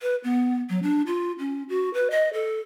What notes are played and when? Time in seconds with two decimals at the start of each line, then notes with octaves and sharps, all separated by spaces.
0.02 B4
0.24 B3
0.69 F#3
0.83 D4
1.07 F4
1.39 C#4
1.69 F#4
1.94 B4
2.11 D#5
2.33 A4